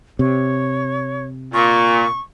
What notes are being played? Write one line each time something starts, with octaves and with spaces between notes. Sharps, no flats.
C3 C#5
A#2 C#6